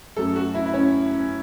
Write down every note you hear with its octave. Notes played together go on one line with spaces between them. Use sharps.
F#2 F#3 A3 A4
F#4
E4
E4
C#4